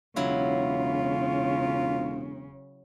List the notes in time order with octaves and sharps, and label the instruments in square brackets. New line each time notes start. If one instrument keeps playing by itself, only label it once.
[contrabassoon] E1 [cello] C#3 [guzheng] F#3 E4 [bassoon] F4